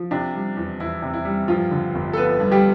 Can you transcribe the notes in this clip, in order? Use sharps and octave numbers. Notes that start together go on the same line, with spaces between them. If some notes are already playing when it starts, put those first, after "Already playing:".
Already playing: F3
C3 D4
G3
E2
E2 E4
C3
E4
G3
G2 F3 F4
D3
G1
A4
F3 B3 B4
G2
G3 G4